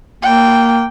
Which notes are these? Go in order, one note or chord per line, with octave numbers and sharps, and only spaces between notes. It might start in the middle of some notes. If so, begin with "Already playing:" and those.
A#3 G5